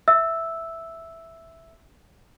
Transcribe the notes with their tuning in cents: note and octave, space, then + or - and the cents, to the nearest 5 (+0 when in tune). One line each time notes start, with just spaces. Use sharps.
E5 +0 E6 +0